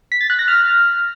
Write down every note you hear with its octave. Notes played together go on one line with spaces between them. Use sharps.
B6
A6
F#6
A#6
F6